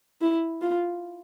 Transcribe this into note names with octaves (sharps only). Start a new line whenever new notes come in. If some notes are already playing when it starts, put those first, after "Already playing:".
E4
F4